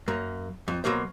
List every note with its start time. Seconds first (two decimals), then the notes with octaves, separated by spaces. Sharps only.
0.08 F#2 A#3
0.68 F2
0.84 B2 F3 F#3 A#3 C5